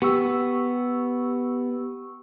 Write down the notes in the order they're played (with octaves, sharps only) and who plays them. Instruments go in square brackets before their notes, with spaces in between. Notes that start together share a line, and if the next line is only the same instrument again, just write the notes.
[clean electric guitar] B3 [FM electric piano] G4 C#6 E6